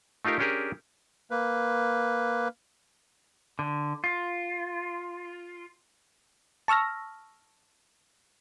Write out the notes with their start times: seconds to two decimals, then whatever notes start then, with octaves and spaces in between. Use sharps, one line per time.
0.25 A3 D#4 F4 G4 A#4
0.39 C#4 D4 G4 G#4 A#4
1.31 A#3 B4
3.59 D3
4.04 F4
6.68 A5 C#6 E6 F6 A#6